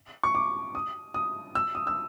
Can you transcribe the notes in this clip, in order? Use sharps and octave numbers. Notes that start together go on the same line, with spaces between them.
C#6
D6
D#6
D#6
E6
D#6
E6